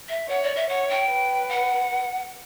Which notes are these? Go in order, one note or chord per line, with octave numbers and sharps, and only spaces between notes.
E5
C#5 F#5
D5
E5
C#5 F#5
G5
B4
F#5